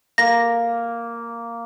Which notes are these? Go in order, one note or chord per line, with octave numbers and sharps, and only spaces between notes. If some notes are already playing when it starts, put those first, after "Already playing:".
A#3 A#6